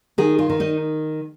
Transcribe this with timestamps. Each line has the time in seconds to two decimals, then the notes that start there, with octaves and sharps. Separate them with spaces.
0.18 D#3 G#4
0.39 F4
0.49 D#3
0.60 D#4 D#5